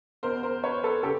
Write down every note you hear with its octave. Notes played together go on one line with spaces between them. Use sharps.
E2 B2 A#4 C5
A#4 C5
B4 C#5
A4 B4
C#3 G4 A4